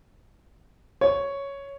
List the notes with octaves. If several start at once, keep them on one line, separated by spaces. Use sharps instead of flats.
C#5